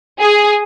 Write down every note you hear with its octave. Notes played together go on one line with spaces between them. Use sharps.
G#4